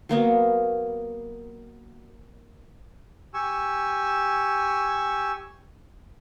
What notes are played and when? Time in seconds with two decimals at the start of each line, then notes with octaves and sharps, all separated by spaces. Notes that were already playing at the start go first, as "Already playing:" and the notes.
0.09 F#3 A#3 B3
3.34 G4 G#5 C#6 E6